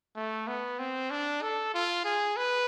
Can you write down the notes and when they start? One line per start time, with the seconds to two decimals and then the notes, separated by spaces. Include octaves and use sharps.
0.16 A3
0.47 B3
0.79 C4
1.10 D4
1.42 A4
1.74 F4
2.04 G#4
2.37 B4